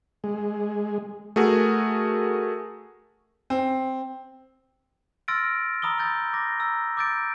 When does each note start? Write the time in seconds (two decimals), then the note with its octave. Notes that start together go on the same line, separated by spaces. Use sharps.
0.24 G#3
1.36 A3 F#4 G#4 A#4
3.50 C4
5.28 C6 E6 F6 A6 A#6 D7
5.82 A#5 B5 D#6 E6 G7
5.98 D#6 E6 G6 A6
6.33 D6 A#6
6.60 A#5 E6
6.97 D6 E6 G6 A6 D7